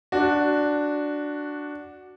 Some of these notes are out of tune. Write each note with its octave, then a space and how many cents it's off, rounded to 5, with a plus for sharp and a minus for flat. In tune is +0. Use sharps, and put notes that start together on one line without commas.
D4 +0 F#4 +0